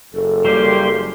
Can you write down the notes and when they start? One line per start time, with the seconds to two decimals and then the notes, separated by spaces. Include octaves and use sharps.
0.14 F#1 A4
0.45 F#3 G3 A#3 G4 C6